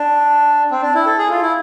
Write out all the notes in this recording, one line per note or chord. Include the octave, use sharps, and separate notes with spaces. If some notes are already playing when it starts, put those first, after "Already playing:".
Already playing: D4
C4
D4
E4
A4
G#4
F4
E4